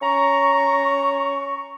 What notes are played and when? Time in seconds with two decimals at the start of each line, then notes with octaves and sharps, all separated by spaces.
0.01 C#4 A#5 C#6